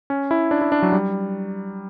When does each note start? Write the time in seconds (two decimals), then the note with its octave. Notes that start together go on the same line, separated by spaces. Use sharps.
0.10 C#4
0.31 E4
0.51 D4
0.61 E4
0.72 D4
0.82 F#3
0.92 G3